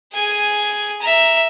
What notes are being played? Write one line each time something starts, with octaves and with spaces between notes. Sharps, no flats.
G#4 G#5
E5 A#5